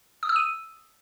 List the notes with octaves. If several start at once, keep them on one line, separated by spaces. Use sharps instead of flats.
D#6
E6
D#7